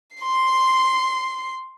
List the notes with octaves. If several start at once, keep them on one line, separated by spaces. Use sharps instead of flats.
C6 C7